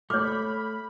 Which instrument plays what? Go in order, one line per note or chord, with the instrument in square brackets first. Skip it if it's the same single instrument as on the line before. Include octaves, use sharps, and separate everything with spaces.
[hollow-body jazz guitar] A3 [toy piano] C#5 D6 [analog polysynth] B5 [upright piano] F6